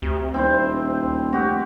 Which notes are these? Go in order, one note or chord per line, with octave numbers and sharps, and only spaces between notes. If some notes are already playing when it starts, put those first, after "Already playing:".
D2 C3
D#1 C4 E4 C5
F1 F#4 G4